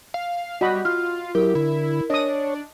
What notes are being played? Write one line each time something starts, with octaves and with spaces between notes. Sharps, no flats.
F5
G3 F#4 D#5 B5
F4 F6
F#3 E4 G4 A#4
D3 E4
D4 C#5 D#5 D#6